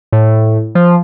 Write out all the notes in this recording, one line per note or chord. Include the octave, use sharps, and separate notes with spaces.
A2
F3